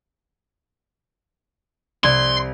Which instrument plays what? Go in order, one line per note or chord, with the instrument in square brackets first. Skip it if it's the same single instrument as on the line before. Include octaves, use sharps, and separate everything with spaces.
[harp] C2 G#6 [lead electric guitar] C6